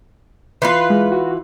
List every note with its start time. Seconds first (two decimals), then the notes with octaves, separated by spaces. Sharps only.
0.62 E3 F4 B4 C6
0.90 G#3
1.12 F#4